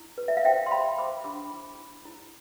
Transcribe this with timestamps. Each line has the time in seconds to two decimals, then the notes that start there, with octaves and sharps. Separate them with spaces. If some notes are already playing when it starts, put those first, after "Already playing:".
Already playing: E4
0.18 B4
0.28 E5
0.37 F5
0.45 C5 E5 G5
0.66 C6
0.71 C5 G5 B5
0.98 C5 B5 D6
1.24 D4 B5 D6
1.51 E4
1.78 E4
2.05 E4